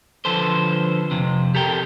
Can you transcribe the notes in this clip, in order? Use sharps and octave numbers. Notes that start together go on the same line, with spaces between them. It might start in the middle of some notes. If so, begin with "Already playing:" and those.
D3 F3 A4 B4 C5
F2 C3
G4 A4 A#4 G5